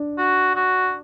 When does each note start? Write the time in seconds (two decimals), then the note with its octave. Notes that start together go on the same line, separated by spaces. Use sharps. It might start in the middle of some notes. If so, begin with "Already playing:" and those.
Already playing: D4
0.18 F#4
0.55 F#4